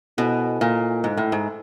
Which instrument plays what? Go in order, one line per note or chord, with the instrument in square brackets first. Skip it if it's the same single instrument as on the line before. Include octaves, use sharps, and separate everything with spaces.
[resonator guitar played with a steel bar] B2 [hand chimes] E4 A4 C5 D#5 G#5
[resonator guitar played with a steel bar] A#2
G#2
A2
G#2